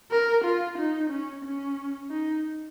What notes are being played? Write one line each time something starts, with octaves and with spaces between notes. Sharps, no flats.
A#4
F4
D#4
C#4
C#4
D#4